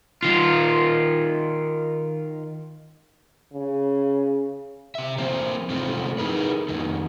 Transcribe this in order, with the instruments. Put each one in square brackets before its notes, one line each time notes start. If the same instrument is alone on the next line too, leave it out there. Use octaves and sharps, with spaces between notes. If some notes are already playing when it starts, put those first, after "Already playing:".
[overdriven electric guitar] D#3 F4
[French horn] C#3
[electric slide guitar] C3 E5
F3 A#3 C4 C5
G#2 C3 F3 A3 C4
D#4 E4 G#4 A#4 B4
F2 D#3